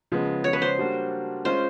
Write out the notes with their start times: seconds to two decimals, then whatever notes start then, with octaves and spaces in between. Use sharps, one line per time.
0.12 C#3 F3 G#3 B3
0.44 C#5
0.53 B4
0.62 C5
0.79 G3 A#3 D4 F#4 A4
1.45 G#3 C#4 F4 C5